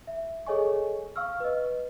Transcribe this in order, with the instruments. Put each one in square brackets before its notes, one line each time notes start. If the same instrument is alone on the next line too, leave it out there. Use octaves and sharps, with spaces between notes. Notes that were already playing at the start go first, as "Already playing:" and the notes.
[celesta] E5
G#4 A4 C#5 D#5 G#5 C#6
F5 C#6 E6 F6
B4 D#5